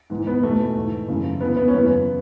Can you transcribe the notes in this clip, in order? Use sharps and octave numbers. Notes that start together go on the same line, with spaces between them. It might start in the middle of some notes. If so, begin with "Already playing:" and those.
G#2 E3
B3
E2 B2 A3
G#2 E3
F#2 C#3 E3
E2 D3 B3
B3
C#4
F#2 C#3 E3 B3